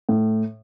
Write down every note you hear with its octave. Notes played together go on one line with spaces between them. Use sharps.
A2